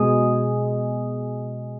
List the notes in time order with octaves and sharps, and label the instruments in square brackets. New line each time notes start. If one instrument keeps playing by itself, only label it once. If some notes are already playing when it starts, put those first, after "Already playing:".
Already playing: [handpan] B2 G#3 G#4